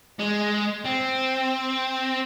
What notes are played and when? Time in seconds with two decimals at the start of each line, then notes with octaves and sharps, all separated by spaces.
0.20 G#3
0.85 C4